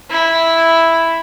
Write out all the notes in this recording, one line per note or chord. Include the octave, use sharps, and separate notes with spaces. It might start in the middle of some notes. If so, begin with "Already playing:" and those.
E4